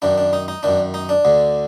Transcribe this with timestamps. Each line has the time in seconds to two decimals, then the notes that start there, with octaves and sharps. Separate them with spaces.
0.02 F#2 D#3 D4
0.18 D4
0.33 D#4
0.48 D#4
0.63 F#2 D#3 D4
0.94 D#4
1.09 D4
1.25 D2 D3